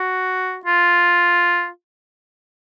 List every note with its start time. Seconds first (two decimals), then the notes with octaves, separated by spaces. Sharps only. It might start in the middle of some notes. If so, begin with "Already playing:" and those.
Already playing: F#4
0.65 F4